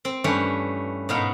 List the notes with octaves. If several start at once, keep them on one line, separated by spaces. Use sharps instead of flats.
C4
G2 E3 G3 A3 C#4 E4
G#2 B2 B3 D#4 A#4 F5